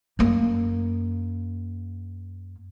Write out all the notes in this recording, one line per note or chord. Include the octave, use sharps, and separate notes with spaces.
F#2 A#3